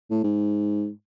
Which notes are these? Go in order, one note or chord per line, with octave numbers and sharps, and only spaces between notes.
A2
G#2